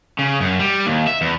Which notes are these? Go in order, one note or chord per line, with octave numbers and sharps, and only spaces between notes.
C#3
F#2
G3
D#2
E5
E2